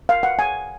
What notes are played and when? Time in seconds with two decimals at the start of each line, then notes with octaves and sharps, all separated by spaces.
0.09 F5
0.23 F#5
0.39 G#5